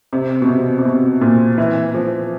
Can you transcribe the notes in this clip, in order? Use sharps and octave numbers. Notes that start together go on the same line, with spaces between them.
C3
B2
C3
C3
B2
A#2
E3
F3